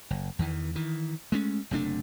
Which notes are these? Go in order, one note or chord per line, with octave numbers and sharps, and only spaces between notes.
F#1
E2 D#3 E3
D#3 E3
G#3 A3 C#4
F#1 C3 A3 D4